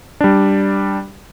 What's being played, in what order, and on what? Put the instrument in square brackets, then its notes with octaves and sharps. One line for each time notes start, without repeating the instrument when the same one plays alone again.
[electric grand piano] G3 D4